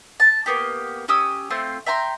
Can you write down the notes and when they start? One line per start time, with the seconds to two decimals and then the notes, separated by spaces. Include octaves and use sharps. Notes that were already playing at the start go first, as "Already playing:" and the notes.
0.20 A5
0.46 A#3 B3 G4
1.08 C#4 G4 D#6 E6
1.50 A3 C4 F4 C6
1.86 E5 G5 A#5 C6